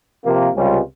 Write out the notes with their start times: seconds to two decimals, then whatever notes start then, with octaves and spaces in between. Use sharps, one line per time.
0.24 C3 F3 A#3
0.55 C#2 C3 G3 C#4 F4